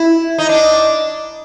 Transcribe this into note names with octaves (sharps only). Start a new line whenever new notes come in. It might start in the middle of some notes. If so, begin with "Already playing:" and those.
Already playing: E4
D#4
D4